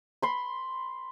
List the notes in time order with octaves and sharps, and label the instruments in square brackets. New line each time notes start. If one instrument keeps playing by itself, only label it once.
[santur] B5 C6